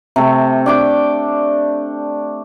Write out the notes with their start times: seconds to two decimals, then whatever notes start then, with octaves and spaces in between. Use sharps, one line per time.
0.16 C3 A3
0.66 D4 G5 D6